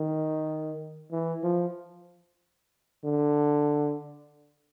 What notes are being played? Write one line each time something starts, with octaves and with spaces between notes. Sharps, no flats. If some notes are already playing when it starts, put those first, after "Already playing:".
Already playing: D#3
E3
F3
D3